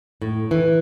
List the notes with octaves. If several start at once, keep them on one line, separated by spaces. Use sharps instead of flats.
A2
E3